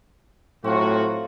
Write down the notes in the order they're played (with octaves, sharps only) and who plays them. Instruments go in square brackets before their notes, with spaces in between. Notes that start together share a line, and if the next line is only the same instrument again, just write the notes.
[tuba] A2 [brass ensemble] F#3 F#4 [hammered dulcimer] C4 F4